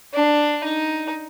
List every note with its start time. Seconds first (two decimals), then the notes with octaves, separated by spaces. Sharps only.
0.14 D4
0.64 D#4